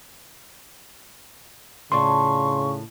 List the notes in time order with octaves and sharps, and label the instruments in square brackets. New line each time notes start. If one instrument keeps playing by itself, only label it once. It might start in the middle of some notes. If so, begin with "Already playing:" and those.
[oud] A2 D4 F4 [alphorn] C#3 [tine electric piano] C6 [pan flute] C#6